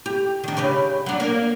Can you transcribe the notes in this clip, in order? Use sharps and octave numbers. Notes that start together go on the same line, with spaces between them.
G4
D#3 D4
C#3 G4 B4
F#3 D4
A#3